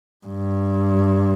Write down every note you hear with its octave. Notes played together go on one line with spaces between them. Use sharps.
G2